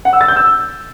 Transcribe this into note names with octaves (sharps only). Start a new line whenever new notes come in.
F#5
E6
A6
G6
E6